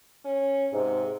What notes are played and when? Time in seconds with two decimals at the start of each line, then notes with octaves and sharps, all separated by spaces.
0.25 C#4
0.73 G#2 C3